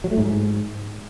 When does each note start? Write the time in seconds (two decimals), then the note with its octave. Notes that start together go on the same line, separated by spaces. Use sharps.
0.04 F#3
0.11 A3
0.18 G#2